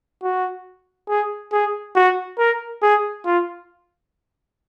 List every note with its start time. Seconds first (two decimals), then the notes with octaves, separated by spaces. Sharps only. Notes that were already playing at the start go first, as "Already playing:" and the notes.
0.23 F#4
1.08 G#4
1.52 G#4
1.95 F#4
2.38 A#4
2.82 G#4
3.25 F4